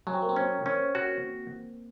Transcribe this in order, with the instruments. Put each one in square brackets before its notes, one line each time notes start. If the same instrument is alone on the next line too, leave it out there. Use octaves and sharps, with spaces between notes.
[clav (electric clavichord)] F#3 [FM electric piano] C#4
[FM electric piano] C4
A#3
C4
[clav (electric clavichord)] C#4
C#4
F#4